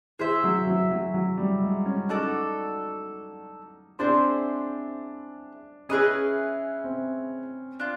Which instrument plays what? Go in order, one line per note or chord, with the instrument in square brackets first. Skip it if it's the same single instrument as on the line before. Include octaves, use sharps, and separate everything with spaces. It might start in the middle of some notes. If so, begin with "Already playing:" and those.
[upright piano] E3 [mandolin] G#4 C5 E5
[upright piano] F#3
F#3
F#3
F#3
G3
G#3
C#4
[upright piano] D#4 [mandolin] F#4 A4 D5
[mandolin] C4 E4 G#4 C5 [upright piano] D4
[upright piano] C#4 [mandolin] E4 G#4 B4 D#5
[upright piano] C4
[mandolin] D4 F4